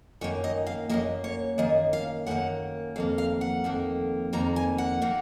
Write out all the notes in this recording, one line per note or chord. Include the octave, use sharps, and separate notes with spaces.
F#2 D#3 A#3 C#5
D#5
F5
F#2 D#3 A#3 D#5
C#5
F#2 D#3 A#3 D#5
F5
F#2 D#3 A#3 F#5
F2 D#3 A#3 F5
F5
F#5
F2 D#3 A#3
F2 D#3 A#3 A#5
G#5
F#5
D#3 A#3